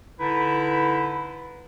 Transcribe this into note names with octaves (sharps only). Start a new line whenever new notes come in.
D3 D#4 E4 B4 B5